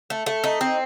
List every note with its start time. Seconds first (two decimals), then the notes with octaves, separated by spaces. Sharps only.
0.10 A3
0.26 A3
0.44 D#4
0.61 C4